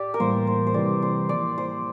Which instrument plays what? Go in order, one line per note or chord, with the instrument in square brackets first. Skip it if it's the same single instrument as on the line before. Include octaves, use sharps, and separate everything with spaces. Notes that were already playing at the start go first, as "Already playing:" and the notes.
Already playing: [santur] G4 D5
A#4
[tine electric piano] A2 E3 G3 A#3 [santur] C5
[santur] C5
C5
[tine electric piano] C3 E3 G3 [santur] D5
[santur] C5
[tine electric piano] F3 A#3 E4 [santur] D5
[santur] C5